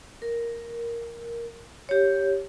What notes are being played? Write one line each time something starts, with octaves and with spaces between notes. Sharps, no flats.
A#4
G4 C#5